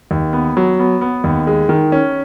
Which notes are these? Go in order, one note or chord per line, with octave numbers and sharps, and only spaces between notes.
D#2
B3
F#3
B3
B3
D#2
G#3
D#3
C#4